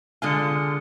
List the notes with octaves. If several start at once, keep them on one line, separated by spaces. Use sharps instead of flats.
D3 G#3 F4 G#5 D#6 C#7